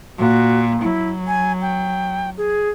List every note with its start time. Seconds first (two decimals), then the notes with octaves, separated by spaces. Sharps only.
0.19 A#2 F#4
0.82 F#3 E4
1.27 G#5
1.62 G5
2.38 G#4